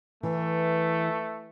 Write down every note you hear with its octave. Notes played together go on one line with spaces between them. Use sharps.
E3 A3